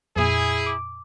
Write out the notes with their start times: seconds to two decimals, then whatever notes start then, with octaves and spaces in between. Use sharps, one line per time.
0.16 F2 A#2 E4 G#4
0.66 D6